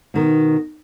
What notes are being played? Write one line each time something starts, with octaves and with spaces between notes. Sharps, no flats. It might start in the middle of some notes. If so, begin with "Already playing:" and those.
B2 D#3